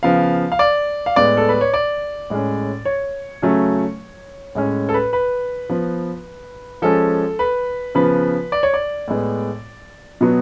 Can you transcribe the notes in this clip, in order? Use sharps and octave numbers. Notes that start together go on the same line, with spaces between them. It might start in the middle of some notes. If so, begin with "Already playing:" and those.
C#3 F3 B3 F5
F5
D5
F5
A2 G#3 B3 D5
A4
B4
C#5
D5
A2 G#3 C#4
C#5
C#3 F#3 A3 C#4
A2 G#3 C#4
A4
B4
B4
F3 B3
F3 G#3 C#4 A4
B4
C#3 F3 B3 B4
D5
C#5
D5
A2 G#3 B3
B2 F#3 B3